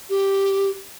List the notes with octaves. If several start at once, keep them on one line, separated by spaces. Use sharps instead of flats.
G4